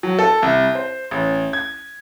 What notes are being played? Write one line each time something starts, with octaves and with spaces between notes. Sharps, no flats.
F#3
A4
C2
C5
A1
G#6